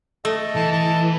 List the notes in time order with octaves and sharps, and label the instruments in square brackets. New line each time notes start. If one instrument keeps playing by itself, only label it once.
[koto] A3 [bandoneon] A4 D#5
[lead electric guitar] E3 [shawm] A5
[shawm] A5